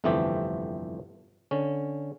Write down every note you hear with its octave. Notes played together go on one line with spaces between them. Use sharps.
G1 F2 C3 E3 A3 G4
D3 C#4